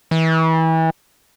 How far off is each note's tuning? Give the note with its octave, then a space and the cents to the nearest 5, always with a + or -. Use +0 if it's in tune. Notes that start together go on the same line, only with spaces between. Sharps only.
E3 -30